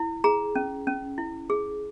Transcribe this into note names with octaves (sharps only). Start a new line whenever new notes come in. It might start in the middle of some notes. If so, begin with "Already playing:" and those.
Already playing: E4
G#4 A#5
C#4
C#4
E4
G#4